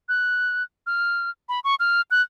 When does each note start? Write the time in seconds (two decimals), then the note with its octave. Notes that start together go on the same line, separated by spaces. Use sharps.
0.09 F#6
0.87 F6
1.49 B5
1.64 C#6
1.80 F6
2.11 F#6